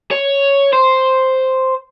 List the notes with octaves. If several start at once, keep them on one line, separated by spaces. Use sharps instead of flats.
C#5
C5